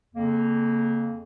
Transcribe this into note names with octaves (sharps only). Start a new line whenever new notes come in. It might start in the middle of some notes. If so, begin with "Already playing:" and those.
F2 C#3 A#3